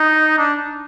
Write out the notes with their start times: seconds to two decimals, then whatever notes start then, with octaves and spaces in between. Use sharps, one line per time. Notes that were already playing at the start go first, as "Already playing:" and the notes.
Already playing: D#4
0.38 D4